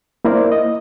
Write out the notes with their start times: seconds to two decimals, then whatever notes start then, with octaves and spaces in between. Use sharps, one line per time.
0.25 A#3 E4 A#4 C5 D5
0.52 D#5